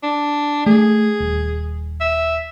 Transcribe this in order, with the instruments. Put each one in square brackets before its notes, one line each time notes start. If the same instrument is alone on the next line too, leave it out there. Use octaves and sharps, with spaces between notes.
[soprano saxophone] D4
[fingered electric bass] A3 [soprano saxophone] G#4
[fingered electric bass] D#1
[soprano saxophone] E5